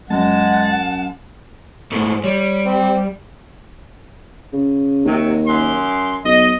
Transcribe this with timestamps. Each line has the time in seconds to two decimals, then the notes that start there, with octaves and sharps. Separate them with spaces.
0.10 F#2 G#3 F#5 A5
1.92 G#2 A3
2.24 G3 C#5
2.65 C4
4.53 C#3
5.05 D#2 C3 F#3
5.47 F#2 C6
6.25 B1 D#5